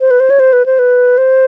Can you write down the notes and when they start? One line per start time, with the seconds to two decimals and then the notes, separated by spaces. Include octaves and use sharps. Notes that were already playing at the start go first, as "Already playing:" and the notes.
0.01 C5
0.11 B4
0.20 C5
0.30 C#5
0.40 C5
0.53 B4
0.66 C5
0.79 B4
1.18 C5